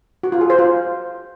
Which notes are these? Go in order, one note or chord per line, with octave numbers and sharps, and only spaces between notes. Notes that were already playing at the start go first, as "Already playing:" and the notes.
F#4
F4
G#4
C5
F4